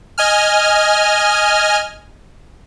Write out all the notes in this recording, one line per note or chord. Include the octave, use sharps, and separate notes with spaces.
D#5 G#5 F6